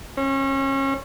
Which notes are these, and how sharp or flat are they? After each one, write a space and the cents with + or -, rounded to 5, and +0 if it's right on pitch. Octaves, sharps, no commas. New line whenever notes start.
C#4 -30